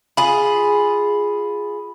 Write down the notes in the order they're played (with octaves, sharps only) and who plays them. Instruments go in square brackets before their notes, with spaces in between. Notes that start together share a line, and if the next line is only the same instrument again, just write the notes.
[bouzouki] F4 G#4 [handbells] B5